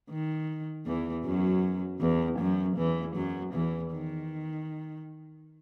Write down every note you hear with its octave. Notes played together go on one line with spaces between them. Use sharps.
D#3
E2 E3
F#2 F#3
E2 E3
F#2 F#3
E2 E3
F#2 F#3
E2 E3
D#3